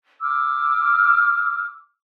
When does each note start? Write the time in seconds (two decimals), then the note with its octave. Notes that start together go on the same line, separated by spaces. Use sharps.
0.21 D6 E6 F6